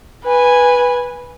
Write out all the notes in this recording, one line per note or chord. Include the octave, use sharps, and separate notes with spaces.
B4 G#5